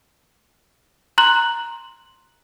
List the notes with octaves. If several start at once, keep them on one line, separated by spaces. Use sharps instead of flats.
A#5 C6 F#6 F#7